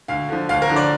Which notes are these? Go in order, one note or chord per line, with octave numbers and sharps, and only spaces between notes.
D2 F5
D3 F3
D2 F5
A#4
D3 F3
D5